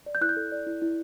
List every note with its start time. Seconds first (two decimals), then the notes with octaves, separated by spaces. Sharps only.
0.06 D5
0.15 G6
0.21 E4 F#6
0.29 G6
0.37 A4
0.52 D5
0.66 E4
0.82 E4